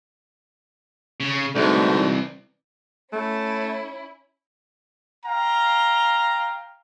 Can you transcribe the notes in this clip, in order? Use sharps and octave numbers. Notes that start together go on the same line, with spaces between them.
C#3
C2 G#2 B2 D3 A3
E3
A3 C#4 E4
F5 G5 A#5